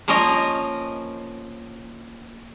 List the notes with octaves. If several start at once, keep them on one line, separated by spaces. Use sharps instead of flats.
F3 A#3 C#4 A#4 D#5